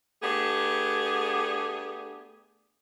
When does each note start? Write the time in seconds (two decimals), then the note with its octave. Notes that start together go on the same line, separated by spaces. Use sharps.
0.21 A3 B3 D4 G4 G#4